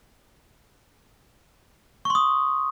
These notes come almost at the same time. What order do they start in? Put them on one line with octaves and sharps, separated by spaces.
C#6 C6 D#6